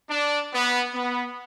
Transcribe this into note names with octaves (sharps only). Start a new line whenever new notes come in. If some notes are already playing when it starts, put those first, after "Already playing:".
D4
B3
B3